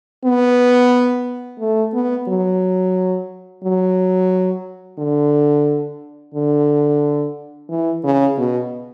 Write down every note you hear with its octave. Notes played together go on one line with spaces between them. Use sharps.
B3
A3
B3
F#3
F#3
D3
D3
E3
C#3
B2